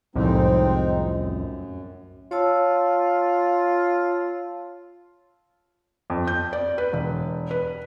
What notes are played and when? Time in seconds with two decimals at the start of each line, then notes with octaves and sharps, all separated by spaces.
0.15 C2 F2 A2 G#3 C4 D#4
0.97 F#2
2.31 F4 C#5 A5 E6
6.10 F2
6.27 G6
6.53 D5
6.78 B4
6.93 E1
7.51 B4